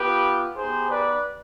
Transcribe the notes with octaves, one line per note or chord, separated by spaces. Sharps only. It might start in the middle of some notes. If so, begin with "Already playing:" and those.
Already playing: B3 F4 G4 B4
B3 D#4 G4 G#4 C5
B4 D5